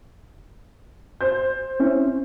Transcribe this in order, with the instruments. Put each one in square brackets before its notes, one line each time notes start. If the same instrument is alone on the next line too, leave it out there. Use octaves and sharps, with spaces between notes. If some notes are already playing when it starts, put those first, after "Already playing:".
[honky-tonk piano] C5 G6
[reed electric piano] C4 C#4 E4